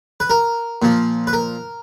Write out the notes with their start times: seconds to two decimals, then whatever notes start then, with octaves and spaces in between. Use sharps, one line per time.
0.20 B4
0.30 A#4
0.82 A#2 F3
1.27 B4
1.33 A#4